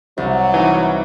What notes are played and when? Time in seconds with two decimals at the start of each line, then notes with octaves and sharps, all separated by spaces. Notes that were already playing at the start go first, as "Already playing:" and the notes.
0.18 C2 F#3
0.54 E3 D#4 G#5